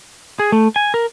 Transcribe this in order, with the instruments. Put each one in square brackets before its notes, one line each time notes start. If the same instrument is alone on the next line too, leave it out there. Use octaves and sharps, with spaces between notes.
[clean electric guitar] G#4
A3
G#5
A#4